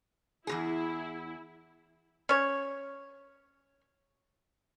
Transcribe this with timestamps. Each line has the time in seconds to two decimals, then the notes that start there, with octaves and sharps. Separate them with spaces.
0.47 E2 C3 E4 G#4
2.29 C#4 C#5